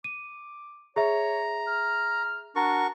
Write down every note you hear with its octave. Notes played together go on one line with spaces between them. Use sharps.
D6 D#7
G#4 C#5 E5 A#5
F6
D4 F#4 A#4 C#6